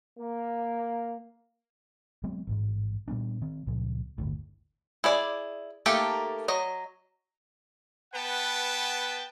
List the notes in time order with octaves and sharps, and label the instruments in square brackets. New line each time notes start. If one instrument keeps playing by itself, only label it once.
[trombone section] A#3
[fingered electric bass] F#3 G#3 B3 C4
A1 F2 G#2
A#2 G3 B3 D4
D#3 C4
C#2 A#2 C#3 F3
G1 D2 A2
[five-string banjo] E4 G#4 D5
A3 A#3 D#4 G4 A4
F#3 D#5
[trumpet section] B3 B4 F#5 G5 A5